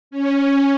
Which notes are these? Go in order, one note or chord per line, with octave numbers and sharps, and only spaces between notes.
C#4